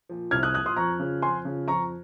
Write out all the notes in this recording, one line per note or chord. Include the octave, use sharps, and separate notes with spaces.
A#2 F3
C2 F6 G#6
D#6 F#6
A#2 F3 D#6 F#6
C6 D#6
F2 A#5 C#6
C#3 F3
F2 G#5 C6
C#3 F3
F2 A#5 C#6